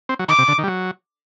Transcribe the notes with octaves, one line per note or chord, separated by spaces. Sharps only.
C4
F#3
D#3 D6
C3
D3
D#3
G3
F#3